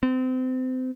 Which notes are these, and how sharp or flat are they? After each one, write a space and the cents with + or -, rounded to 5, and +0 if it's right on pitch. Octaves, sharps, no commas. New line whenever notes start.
C4 -30